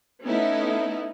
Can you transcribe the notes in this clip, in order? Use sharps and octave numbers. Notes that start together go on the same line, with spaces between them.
A3 B3 C#4 D#4 E4 A4